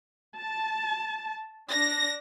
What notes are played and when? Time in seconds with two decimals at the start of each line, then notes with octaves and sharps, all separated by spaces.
0.38 A5
1.70 D4 A#6